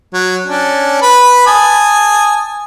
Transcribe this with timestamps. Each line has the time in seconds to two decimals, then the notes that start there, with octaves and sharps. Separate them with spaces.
0.13 F#3
0.46 C#4 D4
1.02 B4 B5
1.47 G#5 A5 D#6